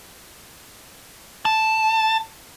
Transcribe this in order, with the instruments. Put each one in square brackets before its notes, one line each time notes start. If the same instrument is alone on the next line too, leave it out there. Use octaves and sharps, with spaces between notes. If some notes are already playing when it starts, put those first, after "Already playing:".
[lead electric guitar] A5